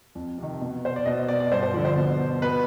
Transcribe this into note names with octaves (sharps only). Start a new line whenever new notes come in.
F2
C3 D#3
B2
C5
D5
B2 D#5
D#5
D5
D5
G2 C5
C5
D3 F3 D5
C5
B2
B2 B4